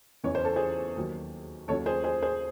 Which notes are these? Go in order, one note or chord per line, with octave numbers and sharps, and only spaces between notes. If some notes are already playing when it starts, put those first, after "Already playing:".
E2 C#3 E3 C#5
C5
A4
G#4 C5
D#2 D#3 F#3
D#2 C#3 F#3 A4 C#5
G#4 C5
G#4 C5
G#4 C5